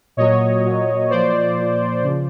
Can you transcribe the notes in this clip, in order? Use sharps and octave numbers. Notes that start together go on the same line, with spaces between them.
A#2 F#3 C#5 D#5
A#2 F#3
A#2 F3 C5 D5
A#2 F3
C#3 F3